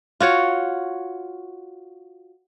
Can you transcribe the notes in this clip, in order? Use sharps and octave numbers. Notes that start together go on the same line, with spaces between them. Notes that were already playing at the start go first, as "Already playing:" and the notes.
F4 F#4 C#5